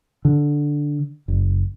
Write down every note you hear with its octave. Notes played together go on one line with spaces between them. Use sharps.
D3
F#1